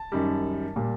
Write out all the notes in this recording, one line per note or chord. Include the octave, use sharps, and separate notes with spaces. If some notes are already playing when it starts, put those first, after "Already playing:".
Already playing: A5
F#2 D#3 G3
A#2 G3